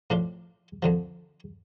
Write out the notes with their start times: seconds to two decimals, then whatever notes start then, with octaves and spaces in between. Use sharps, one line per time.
0.10 A2 F3 D4 F4
0.82 F2 D3 F3